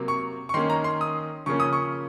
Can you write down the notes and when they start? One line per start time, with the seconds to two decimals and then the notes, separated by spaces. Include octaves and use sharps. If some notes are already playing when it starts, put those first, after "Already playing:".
Already playing: C3 F#3 A#3
0.08 C#6
0.49 C#6
0.54 D#3 A#3 C#4 C6
0.70 A#5
0.84 C6
1.01 D#6
1.46 C#3 F3 A#3 C#4 C#6
1.60 D#6
1.73 C#6